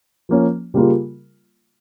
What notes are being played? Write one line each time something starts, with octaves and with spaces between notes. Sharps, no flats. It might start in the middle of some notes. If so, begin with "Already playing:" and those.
F3 A#3 C#4
C#3 G3 A#3 F4 A#4